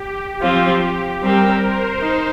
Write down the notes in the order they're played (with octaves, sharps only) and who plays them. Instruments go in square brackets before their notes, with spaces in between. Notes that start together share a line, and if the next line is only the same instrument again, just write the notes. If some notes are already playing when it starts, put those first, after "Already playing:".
Already playing: [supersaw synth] G4
[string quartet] F3 C4 F4 [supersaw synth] G4
[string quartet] G3 C4 G4 [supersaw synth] A#4
[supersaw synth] C5
[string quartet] D#4 [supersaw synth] C5